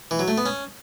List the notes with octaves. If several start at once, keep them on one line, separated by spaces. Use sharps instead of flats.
E3
F#3
A3
B3
C#4